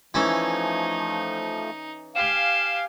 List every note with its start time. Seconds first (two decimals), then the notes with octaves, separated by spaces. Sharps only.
0.14 E3 F3 A3 C#4 D#4 A4
2.15 G4 F5 G#5 E7